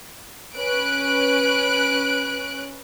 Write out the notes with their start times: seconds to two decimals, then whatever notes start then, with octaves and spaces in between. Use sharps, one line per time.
0.57 C#4 B4 F#6 D7